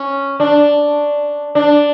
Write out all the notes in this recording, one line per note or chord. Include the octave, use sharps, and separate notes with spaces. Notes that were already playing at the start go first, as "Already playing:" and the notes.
Already playing: C#4
D4
D4